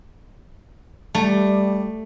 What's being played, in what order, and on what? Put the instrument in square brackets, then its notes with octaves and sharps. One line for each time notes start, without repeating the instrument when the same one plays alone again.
[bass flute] G3 [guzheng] A3